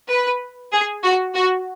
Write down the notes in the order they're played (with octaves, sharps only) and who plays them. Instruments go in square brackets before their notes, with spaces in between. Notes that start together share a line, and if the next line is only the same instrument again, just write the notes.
[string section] B4
G#4
F#4
F#4